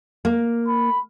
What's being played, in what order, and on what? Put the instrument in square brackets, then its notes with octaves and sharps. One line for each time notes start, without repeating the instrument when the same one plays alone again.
[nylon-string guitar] A#3
[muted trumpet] B5